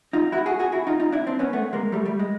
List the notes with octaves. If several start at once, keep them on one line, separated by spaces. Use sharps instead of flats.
D#4 F4
E4 F#4
F#4 G#4
F#4 G#4
E4 F#4
D#4 F4
D#4 F4
D4 E4
C4 D4
B3 C#4
A3 B3
G#3 A#3
G3 A3
G3 A3
G#3